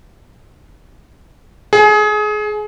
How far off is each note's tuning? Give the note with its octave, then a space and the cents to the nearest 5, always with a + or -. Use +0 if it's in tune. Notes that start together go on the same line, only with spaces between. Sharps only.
G#4 +25